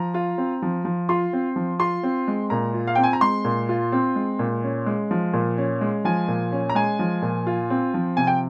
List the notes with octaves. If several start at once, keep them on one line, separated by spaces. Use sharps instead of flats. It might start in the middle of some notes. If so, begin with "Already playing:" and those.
Already playing: F3 A#5
F4
C4
F3
F3
F4 C6
C4
F3
F4 C6
C4
G#3
A#2 A#5
F4
F5
C4 G5
G#5
A#5
G#3 C6
A#2
F4
C4
G#3
A#2
C#4
G#3
F3
A#2
C#4
G#3
F3 G#5
A#2
C#4
A#5
G#3 G#5
F3
A#2
F4
C4
F3
C3 G#5
G5